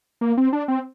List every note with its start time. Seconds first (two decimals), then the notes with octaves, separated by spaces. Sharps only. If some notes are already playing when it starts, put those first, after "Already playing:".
0.21 A#3
0.37 C4
0.53 D4
0.68 C4